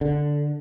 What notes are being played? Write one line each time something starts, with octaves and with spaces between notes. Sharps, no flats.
D3